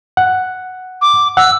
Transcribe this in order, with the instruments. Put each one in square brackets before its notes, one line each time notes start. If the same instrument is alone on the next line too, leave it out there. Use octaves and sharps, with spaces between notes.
[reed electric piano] F#5
[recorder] D6
[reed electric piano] F#5 [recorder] E6